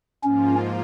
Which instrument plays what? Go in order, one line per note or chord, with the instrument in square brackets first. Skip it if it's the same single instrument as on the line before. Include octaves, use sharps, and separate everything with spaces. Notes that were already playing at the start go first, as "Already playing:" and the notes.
[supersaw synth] G#2 F3 A#3 F4 [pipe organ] C#4